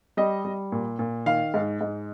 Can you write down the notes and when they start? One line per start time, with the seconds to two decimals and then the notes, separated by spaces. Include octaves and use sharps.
0.17 G3 D#5
0.45 G3
0.72 A#2
0.99 A#2
1.26 D#3 F5
1.54 G#2
1.81 G#2